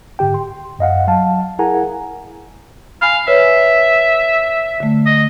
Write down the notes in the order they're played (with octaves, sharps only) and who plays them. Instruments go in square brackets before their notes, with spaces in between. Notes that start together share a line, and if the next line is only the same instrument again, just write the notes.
[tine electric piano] G#2 D3 G4 G5
C6
F#2 D#5 F5 F#5
F#3 F5 A5
E4 G#4 A#4 F#5 G#5 A#5
[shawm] F5 [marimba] G#5 B5
[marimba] B4 C#5 [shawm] E5
[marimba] D3 A3
[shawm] D#5